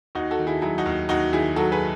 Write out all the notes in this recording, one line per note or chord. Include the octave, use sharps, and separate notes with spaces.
D#2 D#4 F#4
F#4 A4
D#3
E4 G#4
F#3 E4 G#4
D#4 F#4
D#2
D#2 D#4 F#4
D#3 E4 G#4
F#3 F#4 A4
G#4 B4